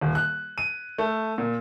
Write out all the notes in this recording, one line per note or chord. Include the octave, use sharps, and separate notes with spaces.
D#1
F#6
D#7
A3
A#2